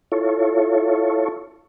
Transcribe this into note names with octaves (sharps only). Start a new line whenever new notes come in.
E4 F4 A4 C#5